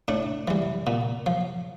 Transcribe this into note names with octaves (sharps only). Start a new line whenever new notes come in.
A2 D4
E3 G3
A#2
F3